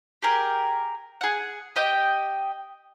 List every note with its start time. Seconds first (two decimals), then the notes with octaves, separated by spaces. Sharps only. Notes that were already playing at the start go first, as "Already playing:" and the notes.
0.22 G4 G#4 A#4
1.21 G#4 F#5
1.76 G4 D#5 G5